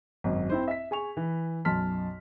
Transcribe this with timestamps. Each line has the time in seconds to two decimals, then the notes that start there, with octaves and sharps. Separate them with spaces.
0.24 G#1 F#2
0.50 C4 E4 C5
0.68 E5 B6
0.91 G#4 G#5 C#6 F7
1.17 E3
1.65 B1 F#2 A5 C6 F6 B6